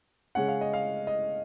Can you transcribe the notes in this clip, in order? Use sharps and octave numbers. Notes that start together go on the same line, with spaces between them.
C#3 G#3 C#4 F#5
F5
D#5
F5
D#5